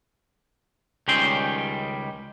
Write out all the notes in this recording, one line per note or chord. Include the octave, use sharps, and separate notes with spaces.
C#2 D#3 G3 C#4 G5 C6